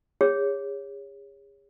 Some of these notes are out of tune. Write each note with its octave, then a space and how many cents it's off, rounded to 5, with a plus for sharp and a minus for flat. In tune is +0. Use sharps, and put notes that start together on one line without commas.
G#4 -40 C#5 +0